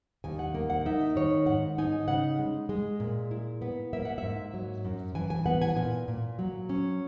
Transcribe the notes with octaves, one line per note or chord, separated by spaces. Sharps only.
D#2 G#5
F#5
A#3
F#5
D#4 E5
D#3 C#5
G#2 F#5
D#4 G#5
C#3 F#5
G#3
G#3
A#2
E4
B3
A#3 E5
F#5
G#2 E5
F#3
F#2
E3 G#5
G#5
B3 F#5
G#5
A#2 G#5
A#2
F#3
C#4